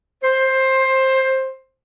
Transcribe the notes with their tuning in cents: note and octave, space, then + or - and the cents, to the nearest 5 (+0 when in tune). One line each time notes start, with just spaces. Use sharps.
C5 +15